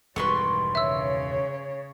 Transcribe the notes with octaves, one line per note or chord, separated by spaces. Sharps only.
E1 G2 D#3 G3 B4 C6 C#6
C#3 C#5 E5 E6